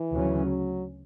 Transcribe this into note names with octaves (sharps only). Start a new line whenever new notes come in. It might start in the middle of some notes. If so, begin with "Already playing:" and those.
Already playing: E3
D2 C#3 F#3 C#4
F#3